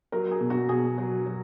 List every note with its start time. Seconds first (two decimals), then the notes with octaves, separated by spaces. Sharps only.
0.12 F#3 A#4
0.31 G#4
0.41 B2
0.50 F#4
0.69 B2 G#4
0.98 F#3
1.26 F#3